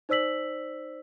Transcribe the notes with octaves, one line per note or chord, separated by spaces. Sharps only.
D#4 C5 D5 E6 B6 F#7